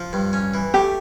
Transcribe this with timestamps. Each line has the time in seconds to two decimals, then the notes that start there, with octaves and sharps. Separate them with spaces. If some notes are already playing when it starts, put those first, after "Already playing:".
Already playing: F3
0.13 G2
0.33 C#4
0.54 E3
0.74 A3 G4